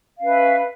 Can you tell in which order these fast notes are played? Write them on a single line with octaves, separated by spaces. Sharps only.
F5 C#4 B4 E5